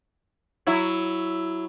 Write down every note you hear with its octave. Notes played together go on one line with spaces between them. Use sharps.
F#3 E4